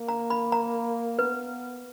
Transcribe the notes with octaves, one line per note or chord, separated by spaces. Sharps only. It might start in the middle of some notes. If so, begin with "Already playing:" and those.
Already playing: A#3
A#5
B5
A#5
B3 B4